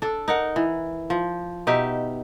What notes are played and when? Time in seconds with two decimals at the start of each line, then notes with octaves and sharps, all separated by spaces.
0.02 D4 A4
0.28 D#4 A#4 F#5
0.56 E3
1.10 F3
1.67 B2 D#4 G4 E5